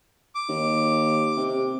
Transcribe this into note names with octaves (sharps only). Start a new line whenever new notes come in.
D6
D#2
C3